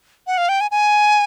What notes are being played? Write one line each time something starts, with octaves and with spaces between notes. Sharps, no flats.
F#5
F5
G5
G#5
G#5